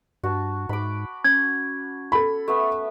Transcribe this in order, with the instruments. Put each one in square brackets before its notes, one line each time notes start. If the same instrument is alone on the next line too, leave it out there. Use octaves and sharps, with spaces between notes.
[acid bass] G2 [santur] F#4 A5
[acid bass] G#2 [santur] B5 D6
[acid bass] C#4 [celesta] G#6
[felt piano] A4 B5
[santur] A3 B3 E5